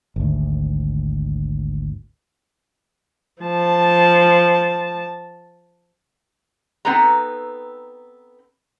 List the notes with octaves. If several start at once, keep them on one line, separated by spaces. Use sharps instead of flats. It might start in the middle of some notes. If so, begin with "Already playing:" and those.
G#1 D2
F3 A5
B3 C4 D#4 A4 B4 A#5